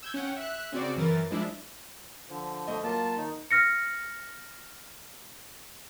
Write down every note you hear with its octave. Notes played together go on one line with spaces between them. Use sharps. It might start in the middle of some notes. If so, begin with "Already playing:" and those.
E6 G6 G#6
C#4 F#5 G5
E5 F#6
C#3 C4 F#4 D5
F#2 E3 A#4 A6
F3 G#3 D4 E4
D3 F3
A3 D#5
F#3 A#3 F4 A5
D#3 D#4
F6 A#6 C#7